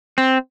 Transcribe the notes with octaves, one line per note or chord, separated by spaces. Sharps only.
C4